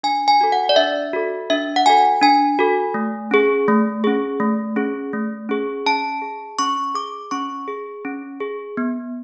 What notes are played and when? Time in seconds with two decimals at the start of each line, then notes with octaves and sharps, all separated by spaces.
0.03 D4 G#5
0.28 G#5
0.41 F#4 A4
0.52 F#5
0.69 D5
0.76 D4 E5
1.13 F#4 A4
1.50 D4 E5
1.76 F#5
1.86 F#4 A4 G#5
2.22 D4 G#5
2.59 F#4 A4
2.94 A3
3.31 C#4 G#4
3.68 A3
4.04 C#4 G#4
4.40 A3
4.76 C#4 G#4
5.13 A3
5.49 C#4 G#4
5.86 C#4 A5
6.22 G#4
6.59 C#4 C#6
6.94 G#4 D6
7.31 C#4 C#6
7.68 G#4
8.05 C#4
8.40 G#4
8.77 B3